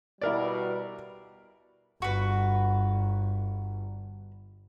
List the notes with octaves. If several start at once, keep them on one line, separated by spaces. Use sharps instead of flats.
B2 G3 E4 A#4 D5
G1 F#4 B4